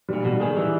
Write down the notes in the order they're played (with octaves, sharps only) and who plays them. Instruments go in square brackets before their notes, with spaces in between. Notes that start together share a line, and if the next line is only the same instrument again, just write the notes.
[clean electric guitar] A#2 [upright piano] G3
[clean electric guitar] B2 [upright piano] G3
[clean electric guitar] D#3 [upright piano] G#4
[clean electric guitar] E3 [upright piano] G3